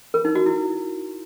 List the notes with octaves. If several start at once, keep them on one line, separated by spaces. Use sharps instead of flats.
A#4
D#4
F#4
E4